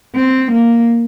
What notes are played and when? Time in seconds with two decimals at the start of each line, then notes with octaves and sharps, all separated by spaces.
0.15 C4
0.51 A#3